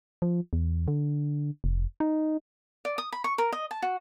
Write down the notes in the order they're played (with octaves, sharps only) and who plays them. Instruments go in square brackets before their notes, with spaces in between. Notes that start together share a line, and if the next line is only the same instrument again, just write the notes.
[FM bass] F3
E2
D3
F1
D#4
[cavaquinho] D5
D#6
B5
C#6
A#4
D#5
A5
F#4